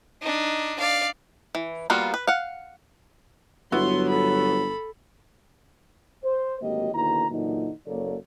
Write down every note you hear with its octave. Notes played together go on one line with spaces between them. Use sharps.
D4 D#4
D5 F5
E3
G3 A#3 B3 F4 F#4
B4
F5 F#5
G1 F#3 B3 E4 F#4 C6
A4 B5
C5
G#1 D2 F#3 A#3 G4 D#5
D#2 B2 D3 E4 A#5
A#2 D3 E3 F#3 D#4
F#1 F#2 A#3 A4 C#5 D5